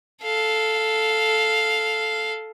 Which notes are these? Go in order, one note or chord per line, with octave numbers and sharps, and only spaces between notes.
A4 F5